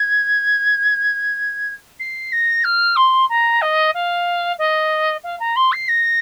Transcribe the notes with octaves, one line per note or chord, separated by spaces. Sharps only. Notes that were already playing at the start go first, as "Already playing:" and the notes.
Already playing: G#6
C7
A#6
F6
C6
A#5
D#5
F5
D#5
F5
A#5
C6
C7
A#6